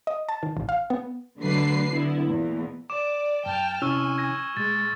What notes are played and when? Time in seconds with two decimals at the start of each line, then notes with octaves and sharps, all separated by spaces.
0.07 D#5
0.29 A5
0.43 D#3
0.57 A1
0.69 F5
0.90 B3
1.40 D3 F#3 A3 D4 B4 C7
1.90 D3 B3 E4
2.28 E2 A#2
2.90 D5 D6 E7
3.46 F#2 G5 A5 F6
3.82 C3 C#4 E4 G#5 C#6 E6 F6
4.17 E6 G#6 A#6
4.57 A#2 G#3 A6